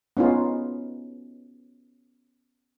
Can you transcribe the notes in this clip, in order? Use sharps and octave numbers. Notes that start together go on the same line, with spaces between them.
B3 C#4 D#4 F4